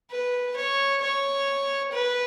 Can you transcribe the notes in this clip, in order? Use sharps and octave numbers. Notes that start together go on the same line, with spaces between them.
B4
C#5
C#5
B4